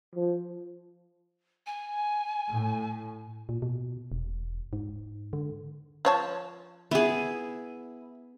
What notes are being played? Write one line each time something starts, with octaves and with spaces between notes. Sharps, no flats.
F3
G#5
A2
A#2
B2
E1
G#2
D3
F3 C#5 A5
B3 E4 G#4